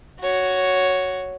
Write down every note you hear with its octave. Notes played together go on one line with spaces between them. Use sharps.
F#4 C#5